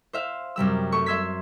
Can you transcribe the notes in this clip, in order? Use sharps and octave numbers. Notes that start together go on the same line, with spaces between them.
C5 E5 F5
F#2 C3 G3 E6
A3 C#6
E5 C6 E6 G#6 B6